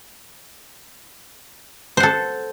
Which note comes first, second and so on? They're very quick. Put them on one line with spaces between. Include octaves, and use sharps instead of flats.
C5 F#5 A4